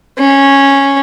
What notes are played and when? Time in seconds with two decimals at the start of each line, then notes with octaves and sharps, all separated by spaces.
0.18 C#4